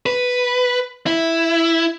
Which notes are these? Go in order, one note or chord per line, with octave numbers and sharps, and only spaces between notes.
B4
E4